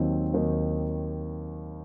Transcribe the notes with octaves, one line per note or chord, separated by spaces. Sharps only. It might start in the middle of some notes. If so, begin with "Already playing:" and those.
Already playing: D#2 D#3 F#3 C4 D#4
D#2 D#3 F#3 C4 D#4